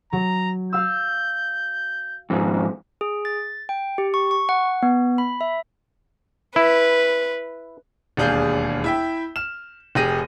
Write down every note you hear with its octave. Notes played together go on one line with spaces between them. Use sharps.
F#3 A#5
F5 E6 G6
F2 G#2
G#4
A6
G5
G4
C#6
C#6
F#5
B3
B5
E5
E4 B4
E1 D#2 D4 G#4 F5 G6
E4 E5 G5
F6 E7
F1 G4 G#4 A#6 D#7